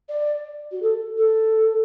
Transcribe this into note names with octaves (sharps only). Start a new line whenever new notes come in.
D5
F#4
A4
A4